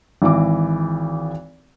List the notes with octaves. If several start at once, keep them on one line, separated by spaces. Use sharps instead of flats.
G#1 E3 D6